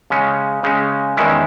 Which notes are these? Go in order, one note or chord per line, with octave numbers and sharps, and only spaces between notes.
C#3 G#3 C#4
C#3 G#3 C#4
E2 D#3 G#3 C#4 E4